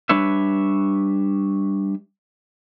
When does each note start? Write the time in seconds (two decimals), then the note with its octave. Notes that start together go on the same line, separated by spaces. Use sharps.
0.09 G3 D4 B4 C#5 E5